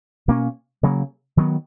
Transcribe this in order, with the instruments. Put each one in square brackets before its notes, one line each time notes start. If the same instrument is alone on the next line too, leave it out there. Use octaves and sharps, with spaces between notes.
[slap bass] B2 A#3 C#4
C#3 F#3 A#3
D#3 F#3 B3